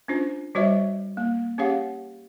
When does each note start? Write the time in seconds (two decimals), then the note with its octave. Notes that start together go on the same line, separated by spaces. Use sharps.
0.08 C#4 D4 F4 C5
0.55 G3 F#4 C5 C#5 D#5 E5
1.17 A#3
1.58 C#4 G4 G#4 C#5 F5 F#5